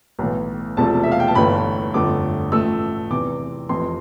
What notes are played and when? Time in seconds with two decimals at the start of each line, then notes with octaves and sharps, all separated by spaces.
0.19 B1 A2 E3
0.77 E1 E2 C3 F3 A3 A5
1.03 E5
1.12 F5
1.20 G5
1.28 A5
1.35 G1 G2 E3 A3 B5
1.94 G1 F2 D3 A3 D6
2.52 A1 A2 F3 A3 E6
3.10 E2 C3 E3 D6
3.69 F1 F2 E3 C6